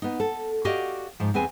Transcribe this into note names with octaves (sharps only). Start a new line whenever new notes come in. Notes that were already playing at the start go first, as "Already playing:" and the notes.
B3 D#4
A4
F#4 G4 D5 D#5 F5
G#2 F3
E2 C4 G#4 B4 G#5